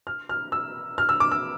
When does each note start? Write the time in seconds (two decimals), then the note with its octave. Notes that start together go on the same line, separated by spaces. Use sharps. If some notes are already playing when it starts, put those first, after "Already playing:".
0.07 F6
0.29 F6
0.52 E6
0.98 F6
1.09 E6
1.20 D6
1.31 E6